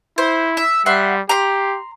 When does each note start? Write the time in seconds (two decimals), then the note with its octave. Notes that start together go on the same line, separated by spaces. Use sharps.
0.18 E4 C5
0.57 E5
0.86 G3 E5 F#5 C6
1.29 G4 A#5 C6